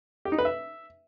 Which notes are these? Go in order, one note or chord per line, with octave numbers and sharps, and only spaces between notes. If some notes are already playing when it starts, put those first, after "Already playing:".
G4
D#4
B4
E5